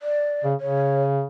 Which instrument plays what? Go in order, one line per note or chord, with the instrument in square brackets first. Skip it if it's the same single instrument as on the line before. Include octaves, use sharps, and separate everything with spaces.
[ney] D5
[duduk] C#3
[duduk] C#3 [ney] C#5